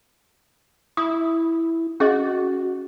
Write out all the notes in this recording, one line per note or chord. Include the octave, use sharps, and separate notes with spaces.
E4 D#6
C#4 F#4 G#4 D#5